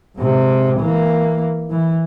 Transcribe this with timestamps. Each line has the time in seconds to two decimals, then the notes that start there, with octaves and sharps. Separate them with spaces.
0.18 G#2 C3
0.80 E3 A#3
1.70 E3